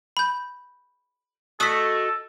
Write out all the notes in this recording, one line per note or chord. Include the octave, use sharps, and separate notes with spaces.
B5 G6
A3 F#4 A4 D#5 D#6 B6